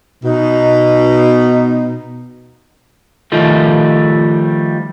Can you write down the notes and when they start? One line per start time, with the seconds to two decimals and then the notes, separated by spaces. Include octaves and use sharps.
0.23 B2 D#4
3.32 D#3 F3 G3 A3